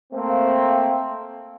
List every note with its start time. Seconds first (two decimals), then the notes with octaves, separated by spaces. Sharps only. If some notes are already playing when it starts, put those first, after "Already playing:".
0.13 A3 A#3 C4